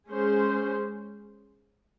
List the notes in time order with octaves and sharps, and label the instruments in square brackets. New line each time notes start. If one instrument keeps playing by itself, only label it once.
[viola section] G#3 C#4 G#4 C5